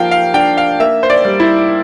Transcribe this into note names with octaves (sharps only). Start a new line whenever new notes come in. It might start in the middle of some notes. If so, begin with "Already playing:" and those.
Already playing: F3 A#3 F5 G5
F5
D4 G5
F5
A#3 E5
C5
D5
G3
E4